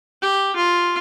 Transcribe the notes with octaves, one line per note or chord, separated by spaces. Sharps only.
G4
F4